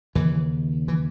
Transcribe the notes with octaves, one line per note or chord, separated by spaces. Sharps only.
D#2 C#3 E3
E3